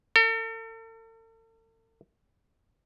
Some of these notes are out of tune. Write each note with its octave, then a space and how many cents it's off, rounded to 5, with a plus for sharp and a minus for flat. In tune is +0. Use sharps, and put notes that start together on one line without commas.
A4 +45